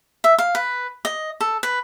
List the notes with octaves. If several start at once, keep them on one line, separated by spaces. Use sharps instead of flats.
E5
F5
B4
D#5
A4
B4